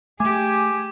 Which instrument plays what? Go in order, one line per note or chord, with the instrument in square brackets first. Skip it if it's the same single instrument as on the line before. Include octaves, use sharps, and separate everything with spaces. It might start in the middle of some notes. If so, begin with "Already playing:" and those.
[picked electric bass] A3 [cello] G4 G#4 [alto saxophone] G#5 [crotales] D6